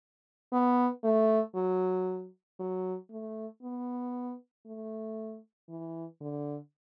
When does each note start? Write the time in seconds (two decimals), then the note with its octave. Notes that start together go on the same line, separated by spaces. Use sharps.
0.52 B3
1.04 A3
1.56 F#3
2.60 F#3
3.11 A3
3.62 B3
4.66 A3
5.69 E3
6.21 D3